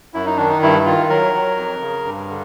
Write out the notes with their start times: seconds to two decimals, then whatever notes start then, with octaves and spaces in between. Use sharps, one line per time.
0.14 F#2 E4
0.26 D#4
0.37 D#3 D4
0.49 D#4
0.62 G2 E4
0.85 D#3 F4
1.09 F#3 A#4
1.34 F#3
1.57 F2
1.81 C#3
2.05 G2
2.29 D3